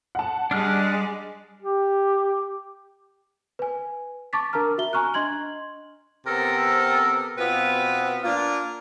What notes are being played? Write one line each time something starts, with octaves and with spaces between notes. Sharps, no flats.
F#5 A5
G3 G#3 D4 F6 F#6
G4
B4 G#5
A5 C#6 D6 A6 B6
D4 A#4 A5 A#5 F6
F#4 E5 G7
G#5 A#5 C#6 F6 F#6
D4 D#5 C6 G#6 F#7
C3 B3 C4 A4 A#4
B2 B3 C4 F4 B4
A#3 D4 F4